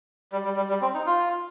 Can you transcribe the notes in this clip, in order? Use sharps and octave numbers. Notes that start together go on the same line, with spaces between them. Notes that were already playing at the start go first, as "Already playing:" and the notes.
G3
G3
G3
G3
C4
D#4
F4